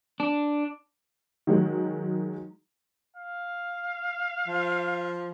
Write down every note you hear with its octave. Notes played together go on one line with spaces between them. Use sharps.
D4
D#3 F#3 G#3
F5
F3